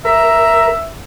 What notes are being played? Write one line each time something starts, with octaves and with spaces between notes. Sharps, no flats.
A#4 E5